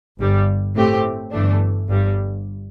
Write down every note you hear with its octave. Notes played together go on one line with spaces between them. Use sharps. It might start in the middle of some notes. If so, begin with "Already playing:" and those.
G1 G2 G3
A2 A3 C4 G4
G1 G2 E3 A3 D4
G1 G2 G3